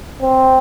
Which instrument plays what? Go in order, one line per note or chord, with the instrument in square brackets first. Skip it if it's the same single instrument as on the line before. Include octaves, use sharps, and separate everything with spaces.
[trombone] C4